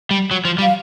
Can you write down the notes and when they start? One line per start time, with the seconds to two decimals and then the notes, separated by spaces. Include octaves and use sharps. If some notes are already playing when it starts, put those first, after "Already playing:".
0.11 G3
0.31 F#3
0.45 F3
0.58 G3
0.62 F5